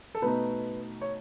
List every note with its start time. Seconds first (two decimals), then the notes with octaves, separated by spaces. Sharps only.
0.15 A4
0.22 B2 A3 D#4 B4
1.01 C#5